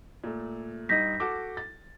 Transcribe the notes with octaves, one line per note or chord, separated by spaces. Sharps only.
A#2 A3
G2 D#4 D#5 G6 A#6 B6
F#4 A4 D6
A6